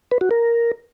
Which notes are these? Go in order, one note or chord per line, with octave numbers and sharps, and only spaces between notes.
B4
F#4
A#4